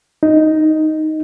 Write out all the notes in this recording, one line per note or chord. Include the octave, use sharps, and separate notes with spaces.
D#4